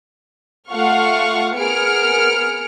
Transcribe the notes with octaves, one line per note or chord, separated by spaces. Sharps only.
A3 F4 F5 F#5 C#6 F6
B3 G#4 A#4 F6 C#7 D7